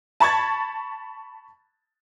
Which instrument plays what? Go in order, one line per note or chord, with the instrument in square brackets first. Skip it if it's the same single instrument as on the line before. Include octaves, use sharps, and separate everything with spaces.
[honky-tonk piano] A5 B5 C#6 G#6 A6